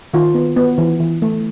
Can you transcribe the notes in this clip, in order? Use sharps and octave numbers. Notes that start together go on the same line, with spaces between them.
D#3 F4
B3
B3
E3
E3
A3